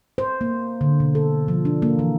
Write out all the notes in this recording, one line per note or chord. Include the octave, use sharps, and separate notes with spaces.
C5
A#3
D3
B2
A4
F3
D4
A#3
E3